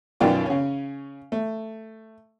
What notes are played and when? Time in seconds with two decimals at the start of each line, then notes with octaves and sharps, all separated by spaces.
0.20 B1 F#2 D#3 F4 D5 G5
0.46 C#3 C#4
1.32 A3